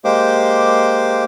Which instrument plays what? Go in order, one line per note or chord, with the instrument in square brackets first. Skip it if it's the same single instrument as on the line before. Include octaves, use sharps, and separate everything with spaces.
[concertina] G#3 A#3 G4 C5 D6